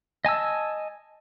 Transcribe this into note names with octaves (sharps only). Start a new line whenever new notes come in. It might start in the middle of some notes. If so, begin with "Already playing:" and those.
D#5 G#5 A5 E6